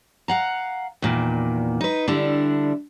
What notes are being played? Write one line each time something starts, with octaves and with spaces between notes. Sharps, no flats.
F5 F#5 A#5
E2 A#2 D#3
D#4 B4
D3 G3 D4 E4